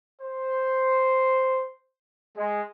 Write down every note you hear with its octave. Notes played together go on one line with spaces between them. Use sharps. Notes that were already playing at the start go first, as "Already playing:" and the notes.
C5
G#3